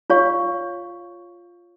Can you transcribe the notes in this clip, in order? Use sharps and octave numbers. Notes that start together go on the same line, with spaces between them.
F4 C#5 F5 C#6